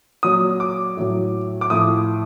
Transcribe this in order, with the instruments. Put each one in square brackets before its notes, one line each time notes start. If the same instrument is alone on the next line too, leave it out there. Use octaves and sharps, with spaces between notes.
[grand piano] A#2 F#3 D#6
D6
A2 F#3
D6
A2 F3 D#6